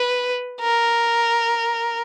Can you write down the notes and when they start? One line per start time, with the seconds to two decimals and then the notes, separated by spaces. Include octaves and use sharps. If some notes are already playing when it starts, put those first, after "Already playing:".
Already playing: B4
0.61 A#4